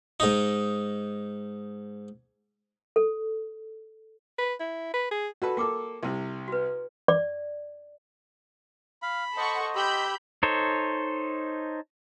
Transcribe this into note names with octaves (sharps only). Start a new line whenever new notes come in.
G#2 D#4
A4
B4
E4
B4
G#4
F#4 A4 B4 D5
A#3 F#4 A4 G5 D6
C2 C3
F#4 B4
D5
F5 B5
A4 C5 D#5 F#5 C#6
G4 B5 E6 G6
D#4 A4 C5 C#5